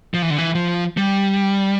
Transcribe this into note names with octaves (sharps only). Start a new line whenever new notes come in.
F3
E3
D3
E3
F3
G3